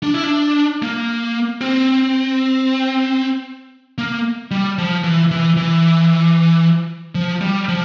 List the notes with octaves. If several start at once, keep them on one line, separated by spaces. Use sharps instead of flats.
D4
E4
D4
A#3
C4
A#3
G3
F3
E3
E3
E3
F3
G3
F3